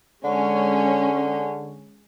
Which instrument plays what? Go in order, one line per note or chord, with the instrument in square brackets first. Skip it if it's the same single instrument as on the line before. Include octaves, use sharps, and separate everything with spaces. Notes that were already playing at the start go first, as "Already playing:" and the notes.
[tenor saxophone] D3 [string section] G#3 C#4